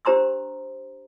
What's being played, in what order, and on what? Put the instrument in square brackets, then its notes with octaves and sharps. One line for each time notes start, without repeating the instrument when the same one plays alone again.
[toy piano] D4 G4 C5 A#5 C6 E6